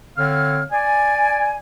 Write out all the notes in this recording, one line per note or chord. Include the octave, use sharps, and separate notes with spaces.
D3 C4 C#5 F5 F6
D5 G#5